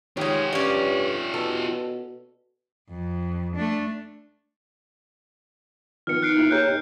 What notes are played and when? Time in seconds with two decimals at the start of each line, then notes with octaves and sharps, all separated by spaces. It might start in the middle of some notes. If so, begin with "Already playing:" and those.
0.17 D#3 G#3 F4 G4 C#5
0.53 G2 C#4 D5
1.34 B2 A4
2.90 F2
3.56 A3 D4
6.07 D#3 F3 B3 F6 C#7
6.23 D#4 F#6 C7 D7
6.36 A#3 E4 F4
6.51 G4 G#4 A#4 C#5 F#6 G6
6.67 D#4 G4